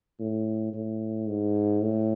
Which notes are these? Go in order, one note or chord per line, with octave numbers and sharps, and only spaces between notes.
A2
A2
G#2
A2